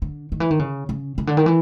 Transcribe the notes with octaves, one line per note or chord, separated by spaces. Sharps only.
D3
D#3
E3
D#3
C#3
C#3
C#3
D3
D#3
E3